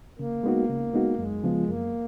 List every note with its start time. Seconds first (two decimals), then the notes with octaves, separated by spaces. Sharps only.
0.18 C#3 A#3
0.44 G#3 B3 D#4 F#4
0.69 C#3
0.94 G#3 B3 D#4 F#4
1.18 F#2 G#3
1.44 C#3 F3 B3 F4
1.68 F#2 A#3